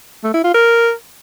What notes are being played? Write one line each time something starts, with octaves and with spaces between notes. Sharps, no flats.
A3
E4
F4
A#4